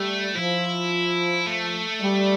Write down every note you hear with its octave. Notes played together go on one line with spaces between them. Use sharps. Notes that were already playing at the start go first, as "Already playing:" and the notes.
Already playing: G3 A3
F3 E4
A3
G3